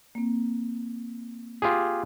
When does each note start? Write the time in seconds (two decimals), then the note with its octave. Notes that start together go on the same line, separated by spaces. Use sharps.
0.15 A#3 C4
1.62 F4 G4 G#4